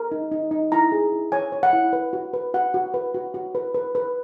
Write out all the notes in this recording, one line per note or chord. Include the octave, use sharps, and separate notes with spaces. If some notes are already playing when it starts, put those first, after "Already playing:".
Already playing: A#4
D#4
D#4
D#4
E4 A#5
G#4
E4
C#5 G#5
C#5
F#5
E4
B4
F#4
B4
F#4 F#5
F#4
B4
F#4
F#4
B4
B4
B4